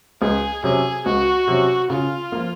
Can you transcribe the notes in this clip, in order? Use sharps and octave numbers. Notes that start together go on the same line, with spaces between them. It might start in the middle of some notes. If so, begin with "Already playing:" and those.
C#2 G#4
C3 F#3 C#4 G#4
C#2 F#4
C3 F#3 C#4
C#3 F4
F3 A#3